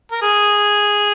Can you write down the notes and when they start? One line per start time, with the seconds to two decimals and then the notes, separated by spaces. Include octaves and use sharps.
0.12 A#4
0.22 G#4